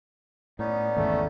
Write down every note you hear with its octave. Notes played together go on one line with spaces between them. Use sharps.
A2 B3 C#4 D#4 D5
G#1 E2 C#3 A3